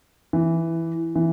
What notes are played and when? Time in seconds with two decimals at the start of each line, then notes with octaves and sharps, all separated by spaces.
0.33 E3
1.16 E3